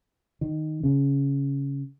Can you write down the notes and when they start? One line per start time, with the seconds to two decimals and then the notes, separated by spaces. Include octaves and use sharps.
0.41 D#3
0.83 C#3